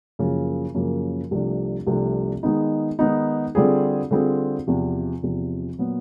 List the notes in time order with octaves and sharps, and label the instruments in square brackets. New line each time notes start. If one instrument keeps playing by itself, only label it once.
[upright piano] F#2 C#3 F3 A#3
F#2 C#3 F3 A#3
C2 C3 F3 A3 D4
C2 C3 F3 A3 D4
D#3 G#3 B3 D#4
D#3 G#3 B3 D#4
D3 G3 C4 F4 G#4
D3 G3 C4 F4 G#4
E2 C3 F3
E2 C3 F3
A#2 F#3 B3